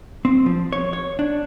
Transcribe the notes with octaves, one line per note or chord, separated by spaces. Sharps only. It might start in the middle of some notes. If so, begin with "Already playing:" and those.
C4
F3
C#5
C#5
D4